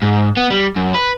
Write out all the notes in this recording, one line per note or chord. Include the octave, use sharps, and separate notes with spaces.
G#2
B3
G3
F#2
B4